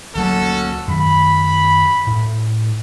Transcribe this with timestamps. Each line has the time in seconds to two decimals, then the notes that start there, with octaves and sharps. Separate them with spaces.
0.15 D2 F#3 A#3 C#4 F#4 A4
0.88 F#2 D#3 B5
2.07 A2